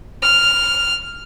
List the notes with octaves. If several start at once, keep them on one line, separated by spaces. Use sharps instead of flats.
F6